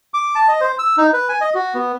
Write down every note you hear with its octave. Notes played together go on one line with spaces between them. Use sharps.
D6
A5
D#5
C5
E6
D#4
B4
G#5
D#5
F#4
B3